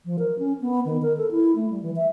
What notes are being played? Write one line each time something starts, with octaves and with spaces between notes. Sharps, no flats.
F3
A#4
C#4
B3
D#3
A#4
A4
E4
A3
G3
E3
E5